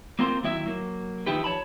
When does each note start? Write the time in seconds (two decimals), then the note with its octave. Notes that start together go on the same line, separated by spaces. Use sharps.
0.19 A#3 C4 F4 A#4 C5
0.43 D#2 F#3 E4 D5 E5
0.66 F#3 A#3
1.26 D#3 F3 D#4 E4 G4 B4
1.44 C#5 A5 B5